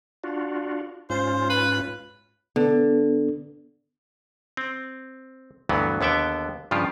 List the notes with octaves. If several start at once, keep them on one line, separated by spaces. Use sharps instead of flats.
D4 F4 F#4
G#2 C#4 F4 C5
B4
D3 B3
C4
D2 G2 E3 F#3 B3
D#2 D3 B3 E5 G5
G2 C#3 F3 F4 G4